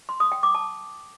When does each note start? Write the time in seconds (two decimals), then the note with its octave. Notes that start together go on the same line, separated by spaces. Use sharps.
0.09 C6
0.20 D#6
0.32 G5
0.43 D6
0.55 A5